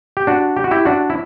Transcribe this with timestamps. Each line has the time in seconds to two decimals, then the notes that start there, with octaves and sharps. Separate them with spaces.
0.17 G4
0.27 D4 F#4
0.57 G4
0.64 F#4
0.71 E4 G4
0.85 D4 F#4
1.10 E4